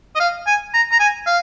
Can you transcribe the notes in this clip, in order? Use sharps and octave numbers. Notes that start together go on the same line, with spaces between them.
D#5
F5
G#5
A#5
A#5
G#5
F5